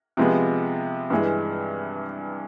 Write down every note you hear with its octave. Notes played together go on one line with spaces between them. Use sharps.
C3 F3 G#3 B3
G2 E3 G#3